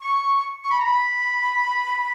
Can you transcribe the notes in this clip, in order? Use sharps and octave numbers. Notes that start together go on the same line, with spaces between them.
C#6
C#6
B5
A#5
B5